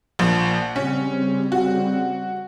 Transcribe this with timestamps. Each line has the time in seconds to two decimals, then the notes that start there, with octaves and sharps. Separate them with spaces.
0.19 A#1 F3 F#5
0.76 C#3 G3 C4 C#4
1.52 F#4